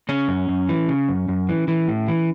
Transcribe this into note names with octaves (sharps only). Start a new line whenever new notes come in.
C#3 C#4
F#2
F#2
E3
C#3
F#2
F#2
E3
E3
A2
E3